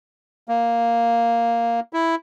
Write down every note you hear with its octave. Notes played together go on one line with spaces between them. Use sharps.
A#3
E4